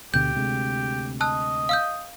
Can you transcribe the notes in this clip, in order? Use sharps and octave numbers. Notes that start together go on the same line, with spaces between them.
D2 B2 D3 G4 G6
D2 C3 G#3
D#5 A5 E6 F#6
F5 E6 G6